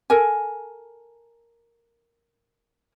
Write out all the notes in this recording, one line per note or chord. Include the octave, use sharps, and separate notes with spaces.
A4 A#4 G#5